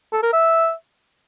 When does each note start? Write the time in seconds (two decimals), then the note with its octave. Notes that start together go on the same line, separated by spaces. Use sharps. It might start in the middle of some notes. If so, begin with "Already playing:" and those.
0.13 A4
0.23 A#4
0.33 E5